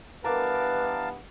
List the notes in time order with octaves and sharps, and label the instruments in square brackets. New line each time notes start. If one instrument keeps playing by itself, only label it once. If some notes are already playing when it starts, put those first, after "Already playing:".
[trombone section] G2 E3 B3 [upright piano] A#4 D6 [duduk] B4 [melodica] F5 A5